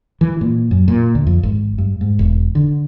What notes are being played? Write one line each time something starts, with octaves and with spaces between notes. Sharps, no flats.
E3
A#2
F#2
A#2
D2
F2
G#1
G2
G#2
E1
D3